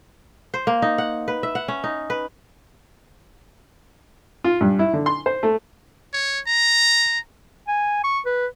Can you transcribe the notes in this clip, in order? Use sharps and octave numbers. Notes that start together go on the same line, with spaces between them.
C5
A#3
D#4
F#5
B4
E5
F#5
C#4
D#4
B4
F4
G2
E4
D3
C6
C5
A3
C#5
A#5
G#5
C#6
B4